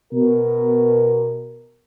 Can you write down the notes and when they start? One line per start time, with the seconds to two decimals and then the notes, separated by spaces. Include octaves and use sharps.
0.13 B2 A#4